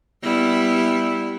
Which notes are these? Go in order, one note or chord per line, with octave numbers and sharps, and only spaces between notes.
G3 B3 E4